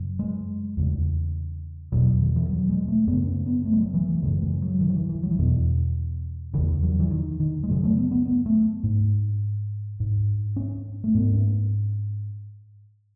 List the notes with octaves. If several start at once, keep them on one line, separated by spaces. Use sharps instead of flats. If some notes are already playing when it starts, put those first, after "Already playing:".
Already playing: F#2 C#3
G#3
E2 C#3
E2 B2 F#3
D#3
E3
F#3
G#3
A3
F#2 C#3 B3
C#4
B3
A3
G#3
F#3
E3
E3
F#2 C#3 G#3
G#3
F#3
D#3
F#3
E3
E3
F#3
E3
E2 B2 D#3
E3
E2 C#3 E3
F#3
E3
D#3
D#3
G#3
F#2 C#3 F#3
A3
B3
B3
B3
A3
G#2
G#2
C#4
A3
G#2 B3
C#4